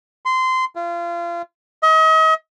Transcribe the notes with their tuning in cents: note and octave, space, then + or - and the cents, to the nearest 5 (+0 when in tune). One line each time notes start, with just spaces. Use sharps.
C6 -20
F4 -30
D#5 +40